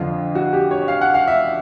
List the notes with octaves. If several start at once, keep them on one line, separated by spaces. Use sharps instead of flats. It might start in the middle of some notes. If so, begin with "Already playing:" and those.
Already playing: F2 D3 F3 F4
F#4
G4
C#5
F5
F#5
F5
E5